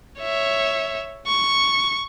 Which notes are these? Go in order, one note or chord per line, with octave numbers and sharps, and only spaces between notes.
C#5 E5
C#6